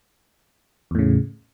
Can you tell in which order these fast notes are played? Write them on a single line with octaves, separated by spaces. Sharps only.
E2 A2 C#3